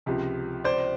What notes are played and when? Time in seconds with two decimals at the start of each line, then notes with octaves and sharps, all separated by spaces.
0.06 C#2 C3 F3
0.64 C5 D5